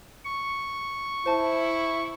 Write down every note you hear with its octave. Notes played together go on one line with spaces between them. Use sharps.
C#6
E4 C5 A5